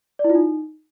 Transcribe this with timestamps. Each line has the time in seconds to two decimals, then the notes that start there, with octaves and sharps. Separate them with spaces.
0.19 D5
0.24 E4
0.30 F4
0.35 D#4